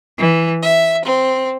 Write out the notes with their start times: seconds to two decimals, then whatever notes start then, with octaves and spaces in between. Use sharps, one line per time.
0.20 E3
0.63 E5
1.04 C4